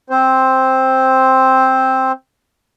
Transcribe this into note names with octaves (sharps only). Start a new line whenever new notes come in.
C4 C5